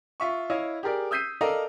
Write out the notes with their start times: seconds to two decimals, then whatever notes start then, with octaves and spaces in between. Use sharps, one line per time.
0.20 F4 E5 C#6
0.50 E4 C#5 D#5 F5
0.83 G4 G#4 A#4 D5
1.11 D#6 E6 G6 B6 C7 D#7
1.41 A4 A#4 D5 D#5 F5 A#5